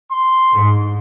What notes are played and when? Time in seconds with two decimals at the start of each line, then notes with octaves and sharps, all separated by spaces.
0.11 C6
0.54 G#2